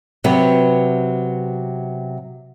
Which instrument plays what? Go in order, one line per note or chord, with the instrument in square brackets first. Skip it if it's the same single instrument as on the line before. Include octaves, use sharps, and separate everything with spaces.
[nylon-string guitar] C3 F#3 B3 B4